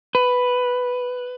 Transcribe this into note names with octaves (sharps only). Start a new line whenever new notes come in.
B4